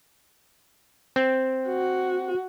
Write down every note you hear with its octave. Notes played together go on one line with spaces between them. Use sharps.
C4
F#4